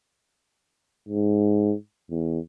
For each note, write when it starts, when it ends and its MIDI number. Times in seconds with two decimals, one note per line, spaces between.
1.09 1.74 44
2.10 2.39 40